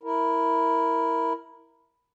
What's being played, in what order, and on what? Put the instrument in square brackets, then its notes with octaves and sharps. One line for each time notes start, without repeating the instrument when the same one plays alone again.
[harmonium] E4 A#4